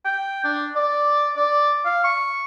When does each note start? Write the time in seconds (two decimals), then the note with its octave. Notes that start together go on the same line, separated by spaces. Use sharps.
0.05 G5
0.44 D4
0.76 D5
1.36 D5
1.85 F5
2.04 C#6